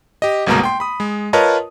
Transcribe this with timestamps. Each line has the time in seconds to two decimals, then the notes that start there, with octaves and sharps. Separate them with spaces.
0.22 G4 D#5
0.47 G1 C2 B2 G#3 A#3 A#5
0.63 G5 C6
0.80 B5 D#6
1.00 G#3
1.33 F4 A#4 B4 C#5 D#5 A5